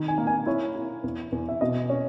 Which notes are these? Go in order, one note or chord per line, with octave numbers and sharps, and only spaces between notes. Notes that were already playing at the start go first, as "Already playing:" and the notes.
Already playing: D#3
G#5
A#3
G#5
E4 C#5
E4
E2
E2
E5
B2 D#5
C#4